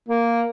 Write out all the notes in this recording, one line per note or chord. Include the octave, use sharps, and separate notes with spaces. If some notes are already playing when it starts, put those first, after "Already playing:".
A#3